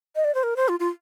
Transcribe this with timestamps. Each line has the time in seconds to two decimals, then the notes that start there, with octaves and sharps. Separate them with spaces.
0.16 D#5
0.24 D5
0.35 C5
0.43 A#4
0.57 C5
0.69 F4
0.80 F4